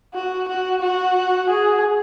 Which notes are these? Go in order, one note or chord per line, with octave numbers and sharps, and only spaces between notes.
F#4
F#4
F#4
G#4